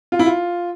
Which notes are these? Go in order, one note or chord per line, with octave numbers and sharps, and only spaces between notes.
F4
E4
F4